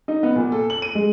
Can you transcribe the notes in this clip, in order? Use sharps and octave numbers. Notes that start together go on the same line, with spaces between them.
D#4
B3
A#2
A4
F#7
D#7
G#3